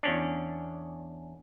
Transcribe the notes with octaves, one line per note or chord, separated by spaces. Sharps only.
E2 C#4 D4